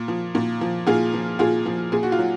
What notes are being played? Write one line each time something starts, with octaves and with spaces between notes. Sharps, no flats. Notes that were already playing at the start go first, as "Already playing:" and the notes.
Already playing: A#2
F3
A#2
F3
A#2 F4 G#4
F3
A#2 F4 G#4
F3
A#2 G#4
F#4
F4
F#3